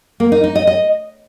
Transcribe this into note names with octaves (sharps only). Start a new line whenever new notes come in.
A#3
D#4
D#4
D#5
D#5